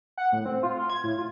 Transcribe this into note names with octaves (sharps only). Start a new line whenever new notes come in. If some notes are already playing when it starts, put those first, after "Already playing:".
F#5
A2
C4
F4
F4
G#6
A2
F4